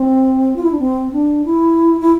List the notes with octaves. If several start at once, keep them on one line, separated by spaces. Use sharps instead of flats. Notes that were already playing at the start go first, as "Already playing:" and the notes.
Already playing: C4
F4
E4
D4
C4
D4
E4
E4